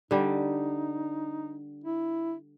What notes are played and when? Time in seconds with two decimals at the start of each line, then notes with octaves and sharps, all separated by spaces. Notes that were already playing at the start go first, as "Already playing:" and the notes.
0.11 D3 G3 D#4
1.84 E4